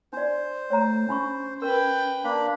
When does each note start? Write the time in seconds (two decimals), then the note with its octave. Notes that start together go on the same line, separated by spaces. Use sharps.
0.13 D4 C5 D5
0.70 A3 C#5 A#5
1.09 C#4 D4 B5 C#6
1.62 A#4 B4 G5
2.24 A#3 D4 B5